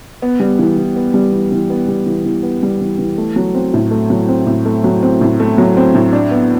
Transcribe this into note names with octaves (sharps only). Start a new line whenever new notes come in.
B3
G3
E3
E3
B3
G3
E3
E3
B3
G3
E3
E3
B3
G3
E3
E3
A3
F#3
C4
A2
A3
F#3
C4
A2
A3
F#3
C4
A2
A3
F#3
C4
A2
D4
B3